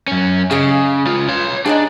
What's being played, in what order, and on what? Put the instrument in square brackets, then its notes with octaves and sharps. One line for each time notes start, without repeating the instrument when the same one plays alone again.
[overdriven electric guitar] F#2 C#4
[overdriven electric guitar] C#3 [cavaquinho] G#4 D#5 F5
[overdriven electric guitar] C#2 F4
C#5 C6
[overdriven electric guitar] D4 [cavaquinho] D#4 F4 G#4